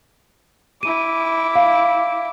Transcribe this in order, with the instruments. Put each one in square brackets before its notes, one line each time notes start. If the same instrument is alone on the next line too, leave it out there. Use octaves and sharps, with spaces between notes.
[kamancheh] E4 D6 [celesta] D#7
[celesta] F5